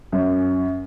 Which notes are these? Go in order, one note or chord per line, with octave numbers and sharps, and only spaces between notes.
F#2